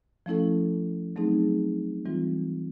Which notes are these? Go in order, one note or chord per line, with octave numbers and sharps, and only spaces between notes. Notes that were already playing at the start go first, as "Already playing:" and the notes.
F3 A3 C#4 E4 A4
F#3 A3 C4 D#4 G#4
E3 G3 C4 F4